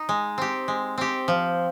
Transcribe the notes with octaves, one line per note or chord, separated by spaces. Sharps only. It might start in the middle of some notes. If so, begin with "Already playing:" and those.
Already playing: D#4
G#3
C4 G4
G#3
C4 G4
F3